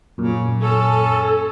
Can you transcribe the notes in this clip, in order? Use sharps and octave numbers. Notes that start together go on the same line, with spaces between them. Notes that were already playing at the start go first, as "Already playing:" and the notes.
F#2 A#2 C#3
C#4 A4